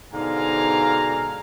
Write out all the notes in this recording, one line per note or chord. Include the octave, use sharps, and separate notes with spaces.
G#2 B2 D3 F5 G#5 A#5